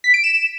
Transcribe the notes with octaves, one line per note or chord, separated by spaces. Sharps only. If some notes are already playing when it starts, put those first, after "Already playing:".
B6
D7
E7